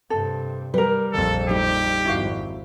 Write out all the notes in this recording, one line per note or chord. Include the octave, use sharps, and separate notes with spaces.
G2 C3 A4
G3 A#4 B4
A#1 F2 A4
G3 D#4 G4
G#1 F2 E4 F#4 F5